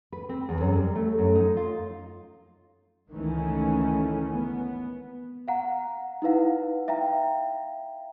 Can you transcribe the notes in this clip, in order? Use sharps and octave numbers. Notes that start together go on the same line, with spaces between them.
B4
C4
E2
F#2
G3
A3
F#2
D#4
F4
C#2 D#3 E3 A3 C#4
B3
F5 F#5 A#5
D#4 E4 B4 F5 F#5
E5 F5 G5 A#5